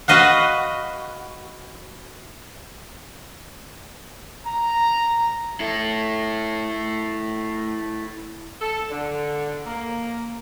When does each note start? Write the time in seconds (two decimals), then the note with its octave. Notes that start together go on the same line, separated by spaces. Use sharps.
0.08 F#4 B4 D#5 F5 F#5
4.46 A#5
5.60 E4 A4
8.61 A4
8.90 D3
9.66 A#3